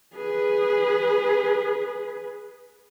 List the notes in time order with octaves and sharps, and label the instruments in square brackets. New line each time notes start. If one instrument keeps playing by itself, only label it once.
[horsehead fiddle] G#4 B4